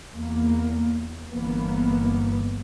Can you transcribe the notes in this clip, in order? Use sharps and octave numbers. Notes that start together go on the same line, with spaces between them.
E2 A#3
G1 E3 A#3 B3